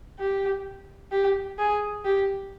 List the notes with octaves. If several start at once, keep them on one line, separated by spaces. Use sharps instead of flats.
G4
G4
G#4
G4